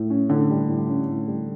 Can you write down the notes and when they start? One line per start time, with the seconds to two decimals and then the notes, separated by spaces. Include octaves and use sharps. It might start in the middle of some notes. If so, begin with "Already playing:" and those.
Already playing: A2
0.10 C#4
0.29 A2 D3
0.49 G3
0.68 A2
0.87 C#4
1.08 A2
1.27 G3